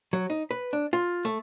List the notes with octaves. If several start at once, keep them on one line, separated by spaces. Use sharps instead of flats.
F#3
D#4
B4
D4
F4
A3